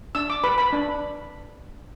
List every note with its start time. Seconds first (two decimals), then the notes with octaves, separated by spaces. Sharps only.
0.15 D4 E6
0.30 D6
0.44 B4 B5
0.58 B5
0.73 D4